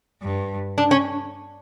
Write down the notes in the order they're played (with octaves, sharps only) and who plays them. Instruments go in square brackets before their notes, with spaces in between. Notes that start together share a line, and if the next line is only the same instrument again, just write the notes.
[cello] G2
[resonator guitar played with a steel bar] D4
C#4